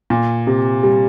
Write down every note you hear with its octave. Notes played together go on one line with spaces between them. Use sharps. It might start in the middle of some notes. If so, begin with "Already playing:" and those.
A#2
C3
G3